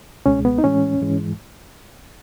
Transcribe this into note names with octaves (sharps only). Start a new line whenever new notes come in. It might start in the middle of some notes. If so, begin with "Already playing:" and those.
C#2 B2 G#3 C#4
B3
D#4
A2 E3 G#3 C#4
G#2 E3 G#3